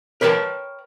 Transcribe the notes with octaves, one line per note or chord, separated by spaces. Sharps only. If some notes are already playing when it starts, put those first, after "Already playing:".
A#4 B4 C#5 G5 A5